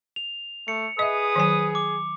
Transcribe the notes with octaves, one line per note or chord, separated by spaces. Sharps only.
F7
A3 C#7
G#4 B4 D#5 E5 D#6
D#3 F#3 G#5
D6